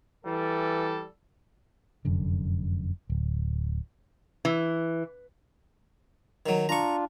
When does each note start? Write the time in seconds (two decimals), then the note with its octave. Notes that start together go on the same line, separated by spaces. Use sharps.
0.25 E3 G3 A4
2.05 F1 F#2 D3
3.10 D1
4.45 E3
6.46 D#3 F#3
6.69 D4 F4 A#5 C#6